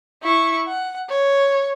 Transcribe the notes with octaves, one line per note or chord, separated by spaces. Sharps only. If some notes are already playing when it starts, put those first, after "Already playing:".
E4 C#6
F#5
C#5